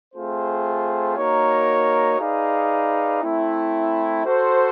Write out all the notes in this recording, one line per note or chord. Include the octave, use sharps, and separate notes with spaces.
A3 C4 F4 G#4 C5
A#3 D#4 F#4 A#4 C#5
D#4 G#4 B4 D5 F5
A3 C4 E4
F#4 A4 C5